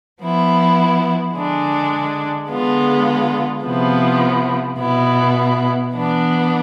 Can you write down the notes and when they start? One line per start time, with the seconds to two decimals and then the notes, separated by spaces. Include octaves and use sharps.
0.22 F3 B3 E4
1.36 D3 G#3 D4
2.50 D3 G#3 B3 F4
3.64 C3 F3 B3 E4
4.78 B2 B3 E4
5.93 E3 B3 D4